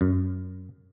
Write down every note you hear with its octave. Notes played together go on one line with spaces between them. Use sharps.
F#2